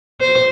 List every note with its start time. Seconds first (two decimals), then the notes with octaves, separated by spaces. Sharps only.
0.20 C5